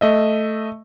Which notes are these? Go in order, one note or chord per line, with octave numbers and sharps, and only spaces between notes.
A3 D#5 E5